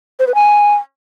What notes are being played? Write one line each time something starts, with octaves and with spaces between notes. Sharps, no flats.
C5
B4
G#5